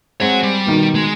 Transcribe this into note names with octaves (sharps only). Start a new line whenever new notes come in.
G#3 C4 C#5 F#5
G3
B2 D#3
G#3